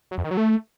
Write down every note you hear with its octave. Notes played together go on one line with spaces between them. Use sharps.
F#3
F2
D#3
F#3
A3